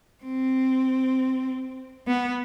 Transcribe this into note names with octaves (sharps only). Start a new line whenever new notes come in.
C4
B3